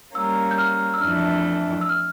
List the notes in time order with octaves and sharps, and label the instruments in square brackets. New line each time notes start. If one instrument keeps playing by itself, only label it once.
[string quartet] G3 A#3 C#4 [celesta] E6
[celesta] G6
F6
E6
[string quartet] F2 E3 A3 D4 [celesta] F6
[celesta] E6
F6